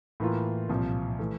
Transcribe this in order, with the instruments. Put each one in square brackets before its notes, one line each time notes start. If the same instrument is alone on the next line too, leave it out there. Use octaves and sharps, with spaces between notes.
[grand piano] A2 E3 A#3 F4
C2 A#2 F3
E3 A3